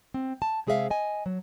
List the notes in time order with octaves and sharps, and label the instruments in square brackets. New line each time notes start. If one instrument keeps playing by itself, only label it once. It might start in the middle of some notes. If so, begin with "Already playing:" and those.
[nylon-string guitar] C4
A5
C3 G#3 G#4 A#4 E5 F5
D#5 G#5
F#3